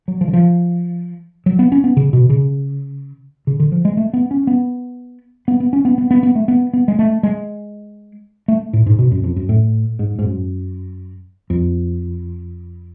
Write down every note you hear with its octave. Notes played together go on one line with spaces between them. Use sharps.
F#3
F3
D3
F3
F#3
B3
C#4
B3
C#3
B2
C#3
C#3
D3
F3
G#3
A3
B3
C#4
B3
B3
B3
C#4
B3
B3
B3
B3
A3
B3
B3
G#3
A3
G#3
A3
A2
G#2
B2
F#2
F2
F#2
A2
G#2
G#2
F#2
F2